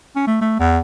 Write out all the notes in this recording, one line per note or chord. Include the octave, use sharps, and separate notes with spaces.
C#4
A3
A3
E2